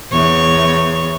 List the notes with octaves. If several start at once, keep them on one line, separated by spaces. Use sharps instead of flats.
E2 C#5